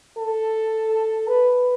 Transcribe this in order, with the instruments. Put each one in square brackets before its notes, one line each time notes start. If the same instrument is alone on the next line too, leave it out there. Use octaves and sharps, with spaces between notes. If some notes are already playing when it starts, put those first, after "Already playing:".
[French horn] A4
B4